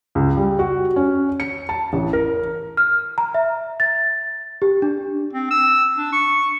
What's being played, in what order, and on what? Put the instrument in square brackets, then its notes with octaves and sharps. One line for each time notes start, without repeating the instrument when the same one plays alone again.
[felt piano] C#2
G3
F#4
C#4
C#7
A5
A1
A#4
[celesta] F6
A#5
E5
A6
G4
D4
[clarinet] C4
E6
D4
C#6